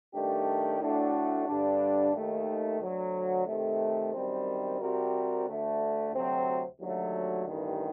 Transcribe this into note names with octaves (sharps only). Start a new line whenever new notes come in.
G2 D#3 A3 D4 G4
A2 A3 D4 F#4
G2 D3 G3 D4
D#2 D#3 A3
D2 D3 F#3
C3 D#3 A3
F#2 D#3 G3 C4
C3 G3 C4 F#4 A#4
D2 D3 A3
D2 C3 F#3 C4
D#2 D3 F#3 A3
A1 G2 D#3